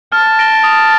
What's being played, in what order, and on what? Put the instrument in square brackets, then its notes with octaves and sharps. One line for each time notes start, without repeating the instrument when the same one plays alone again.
[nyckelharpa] A5 [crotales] F6
[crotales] A#6 D7 G7
D#6